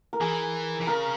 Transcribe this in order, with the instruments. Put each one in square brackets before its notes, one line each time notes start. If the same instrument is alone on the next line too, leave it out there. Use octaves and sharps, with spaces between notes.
[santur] A#4
[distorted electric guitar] E3 [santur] G#4
[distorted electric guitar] E3
[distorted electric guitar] C#3 [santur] A#4